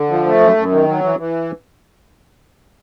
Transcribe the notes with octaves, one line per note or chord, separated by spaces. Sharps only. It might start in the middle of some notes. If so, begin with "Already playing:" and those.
Already playing: D3
F3
A3
F#2
F#2
D#3
F#3
E3
E3